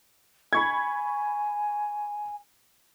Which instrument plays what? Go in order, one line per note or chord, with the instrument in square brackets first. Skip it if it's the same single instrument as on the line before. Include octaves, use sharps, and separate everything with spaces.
[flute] G#5 [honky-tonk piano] B5 C#6 G#6